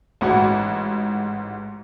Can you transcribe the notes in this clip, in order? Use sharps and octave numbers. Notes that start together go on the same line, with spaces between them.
A1 G#2 F#4